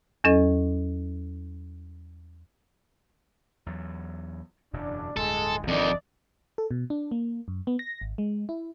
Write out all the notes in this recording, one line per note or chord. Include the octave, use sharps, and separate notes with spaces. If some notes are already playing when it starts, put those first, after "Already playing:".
E2 F#3 C#4 A4 D#5
E2 F#3
E1 F#2 C#3 D4
D1 G2 G#3 A4
G1 F2 D#3 D4 D5 D#5
A4
B2
D4
A#3
F#2
B3
A#6
G#1
G#3
E4